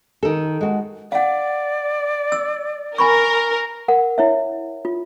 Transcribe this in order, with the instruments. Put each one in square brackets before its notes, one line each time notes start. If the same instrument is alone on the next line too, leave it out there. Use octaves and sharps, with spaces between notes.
[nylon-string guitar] D#3 A4
G#3 F#4
[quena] D5 [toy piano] F5 F#5
[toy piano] E6
[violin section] A#4 [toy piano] G#5 B5 C#6
[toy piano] A#4 F#5
E4 C#5 E5
F4